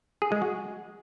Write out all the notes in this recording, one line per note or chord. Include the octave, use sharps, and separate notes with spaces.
G#4
G#3
F#4